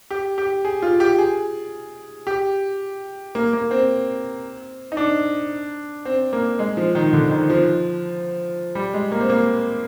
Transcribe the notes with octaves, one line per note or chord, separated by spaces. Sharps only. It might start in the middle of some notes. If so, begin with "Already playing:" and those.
G4
G4
G#4
F4
G4
G#4
G4
A#3
A#3
C4
D#4
D4
C4
A#3
G#3
F3
D#3
D3
D#3
F3
G3
G#3
A#3
C4
A#3